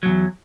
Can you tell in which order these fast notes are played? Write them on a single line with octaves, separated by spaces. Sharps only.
F#3 G#2 E2